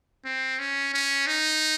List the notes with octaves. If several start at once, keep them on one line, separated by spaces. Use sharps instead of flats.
C4
C#4
C#4
D#4